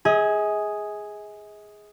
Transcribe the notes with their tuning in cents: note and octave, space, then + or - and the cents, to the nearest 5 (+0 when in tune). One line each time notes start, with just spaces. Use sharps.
G#4 +0 D#5 +45